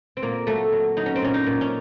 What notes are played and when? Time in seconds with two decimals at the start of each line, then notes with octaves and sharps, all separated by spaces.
0.17 C4
0.22 A#2 A#3
0.47 F#3 A3
0.72 F#3
0.97 F#3 D#4
1.06 C#4
1.16 C4
1.22 A#2 C#4
1.34 D#4
1.47 A#2
1.61 C#4